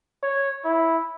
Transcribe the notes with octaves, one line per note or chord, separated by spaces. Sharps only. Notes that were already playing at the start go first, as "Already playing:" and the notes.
C#5
E4